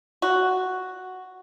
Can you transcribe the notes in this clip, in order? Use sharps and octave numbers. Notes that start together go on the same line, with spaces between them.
F#4